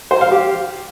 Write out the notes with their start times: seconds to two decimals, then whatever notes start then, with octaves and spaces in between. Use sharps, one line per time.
0.11 C5
0.21 F5
0.31 G4